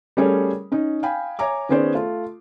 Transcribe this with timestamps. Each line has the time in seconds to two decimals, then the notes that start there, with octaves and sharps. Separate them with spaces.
0.17 G3 A3 C#4 G#4 A#4 C#5
0.72 C#4 D#4
1.03 F5 G5 G#5 B5
1.39 C#5 E5 G#5 A#5 D6
1.69 D#3 B3 C#4 G#4 C5 D5
1.95 A3 F4